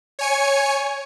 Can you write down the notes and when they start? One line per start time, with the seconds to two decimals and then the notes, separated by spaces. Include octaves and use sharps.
0.19 C#5 G#5 C#7